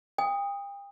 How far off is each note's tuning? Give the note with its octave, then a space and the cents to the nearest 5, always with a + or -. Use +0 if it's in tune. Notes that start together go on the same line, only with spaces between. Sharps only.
G5 +35 D#6 +0